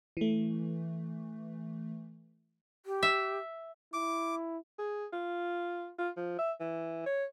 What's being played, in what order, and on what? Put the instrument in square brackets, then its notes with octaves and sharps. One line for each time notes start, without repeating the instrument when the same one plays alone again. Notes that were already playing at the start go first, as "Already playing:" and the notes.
[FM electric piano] E3 A3
[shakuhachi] G4
[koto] E5
[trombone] E4 [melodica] D6
[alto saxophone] G#4
F4
F4
F3
E5
E3
C#5